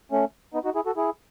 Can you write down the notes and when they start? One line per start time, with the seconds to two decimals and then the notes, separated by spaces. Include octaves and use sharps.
0.12 A3 C#4
0.54 B3 D#4
0.65 D#4 F#4
0.75 E4 G#4
0.86 F#4 A4
0.97 E4 G#4